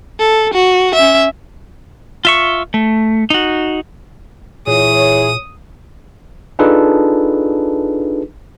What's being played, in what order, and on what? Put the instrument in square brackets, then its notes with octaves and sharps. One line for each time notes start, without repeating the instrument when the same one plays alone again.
[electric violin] A4
F#4
C#4 E5
[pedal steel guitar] F4 E5 C#6
A3
D#4 F#4
[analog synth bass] A#2 [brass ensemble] E3 E4 C#5 [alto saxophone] G#4 [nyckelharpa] D#6
[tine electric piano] D4 D#4 F4 G#4 A4 B4